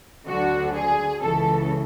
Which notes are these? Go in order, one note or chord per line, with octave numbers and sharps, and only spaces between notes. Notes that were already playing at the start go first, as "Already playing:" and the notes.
D2 D3 F#3 F#4
G#4
C#2 C#3 E3 A4